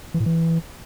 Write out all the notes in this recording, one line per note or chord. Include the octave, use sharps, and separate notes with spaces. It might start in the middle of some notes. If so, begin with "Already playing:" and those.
E3
A2
E3